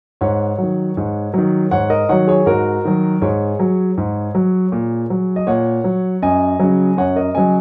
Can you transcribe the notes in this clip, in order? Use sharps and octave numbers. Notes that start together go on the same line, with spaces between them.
G#2 C#5 F#5
D#3 F#3
G#2
D#3 F#3
G#2 C#5 F#5
A#4 D#5
D#3 F#3 C#5 F#5
G#4 C#5
G#2 F#4 A#4
D#3 F#3
G#2 G#4 C#5
F#3
G#2
F#3
A#2
F#3
D#5
A#2 C#5 F#5
F#3
F#2 D#5 G#5
C#3 F#3
F#2 C#5 F#5
A#4 D#5
C#3 F#3 D#5 G#5